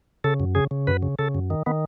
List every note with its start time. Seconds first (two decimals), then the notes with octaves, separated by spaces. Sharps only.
0.24 C#3 A4
0.40 F#2
0.55 C#3 G#4
0.71 C#3
0.87 F#2 B4
1.03 C#3
1.19 C#3 A4
1.35 F#2
1.50 D#3
1.66 D#3 B3